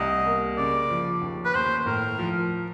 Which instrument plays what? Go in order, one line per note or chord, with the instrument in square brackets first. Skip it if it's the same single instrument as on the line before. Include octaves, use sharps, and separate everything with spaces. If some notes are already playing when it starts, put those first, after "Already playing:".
Already playing: [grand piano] C2 G3 [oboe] D#5
[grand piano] A#3
[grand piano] C#3 [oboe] D5
[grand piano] F3
D#2
[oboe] B4
[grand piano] D#2 [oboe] C5
[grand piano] A2 [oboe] A#4
[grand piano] F3